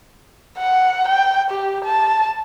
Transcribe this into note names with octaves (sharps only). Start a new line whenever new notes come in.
F#5
G5
G4
A5